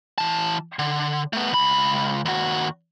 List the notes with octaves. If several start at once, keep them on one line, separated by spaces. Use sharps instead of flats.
E3 A5
D3
A3 B3
C#2 B5
D#2 F#4